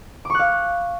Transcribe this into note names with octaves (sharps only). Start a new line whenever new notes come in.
F5 C#6 D6 F#6